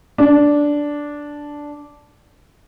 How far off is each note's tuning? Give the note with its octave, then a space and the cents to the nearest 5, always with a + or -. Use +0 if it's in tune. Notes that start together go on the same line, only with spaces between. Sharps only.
D4 -5